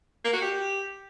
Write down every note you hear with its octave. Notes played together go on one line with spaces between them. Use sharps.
A#3
F#4
G4